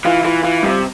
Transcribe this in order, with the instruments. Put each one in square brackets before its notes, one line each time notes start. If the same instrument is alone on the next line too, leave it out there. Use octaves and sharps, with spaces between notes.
[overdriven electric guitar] E3 [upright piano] F4
[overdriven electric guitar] E3 [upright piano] F4
[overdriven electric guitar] E3 [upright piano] F4
[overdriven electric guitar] C3 [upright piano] G3